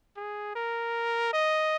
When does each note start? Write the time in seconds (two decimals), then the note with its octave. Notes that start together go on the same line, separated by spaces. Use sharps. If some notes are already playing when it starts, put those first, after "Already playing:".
0.17 G#4
0.55 A#4
1.33 D#5